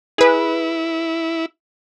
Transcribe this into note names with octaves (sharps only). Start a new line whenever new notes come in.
E4 G#4 B4